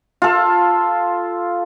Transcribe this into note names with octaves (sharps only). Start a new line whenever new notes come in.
F4 A4